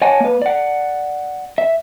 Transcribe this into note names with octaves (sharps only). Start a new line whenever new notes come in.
C#5 D#5 F#5 G#5 A5
A#3 B4
D5 F#5
E5